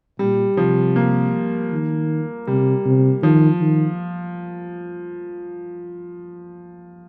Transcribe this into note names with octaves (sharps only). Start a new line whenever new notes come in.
A#2 G3
C3 F3
A#3
D#3
C3 G3
C3
D#3 F3
D#3